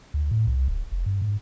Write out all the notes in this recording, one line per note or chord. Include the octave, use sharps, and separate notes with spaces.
D2
A2
C2
D1
F1
G2
G#2